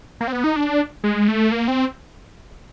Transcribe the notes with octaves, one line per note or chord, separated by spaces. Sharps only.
A#3
C4
B3
D#4
D4
G#3
A3
A#3
C4